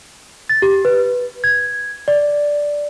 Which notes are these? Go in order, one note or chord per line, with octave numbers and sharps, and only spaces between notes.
A6
G4
B4
G#6
D5